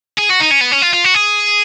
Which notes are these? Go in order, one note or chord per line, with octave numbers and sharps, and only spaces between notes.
G#4
F#4
D#4
C#4
B3
C#4
F4
F4
F#4
G#4